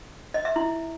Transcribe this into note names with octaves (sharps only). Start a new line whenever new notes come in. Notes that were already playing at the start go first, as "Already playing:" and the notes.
D#5
E5
E4